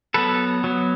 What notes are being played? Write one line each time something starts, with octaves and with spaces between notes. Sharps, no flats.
F#3 B3 A4 B4
F#3 B3